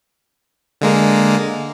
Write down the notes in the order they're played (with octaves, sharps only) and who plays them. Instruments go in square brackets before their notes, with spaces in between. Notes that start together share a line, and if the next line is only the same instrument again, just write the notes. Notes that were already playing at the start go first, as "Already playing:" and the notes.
[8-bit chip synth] D3 G#3 A#3